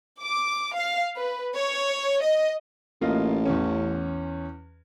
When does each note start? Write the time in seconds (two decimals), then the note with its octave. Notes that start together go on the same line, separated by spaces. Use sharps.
0.21 D6
0.74 F5
1.17 B4
1.55 C#5
2.23 D#5
3.01 A1 A#3 F4 D#5
3.45 E2 C#4